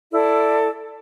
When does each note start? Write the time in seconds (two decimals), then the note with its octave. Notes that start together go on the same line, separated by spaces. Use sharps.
0.12 E4 A4 D5